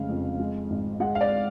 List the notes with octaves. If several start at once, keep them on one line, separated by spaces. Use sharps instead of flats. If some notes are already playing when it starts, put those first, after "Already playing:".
Already playing: F1 C#3 G#3 F5
F2
G#3
G#1
G#3 F#5
F5
D5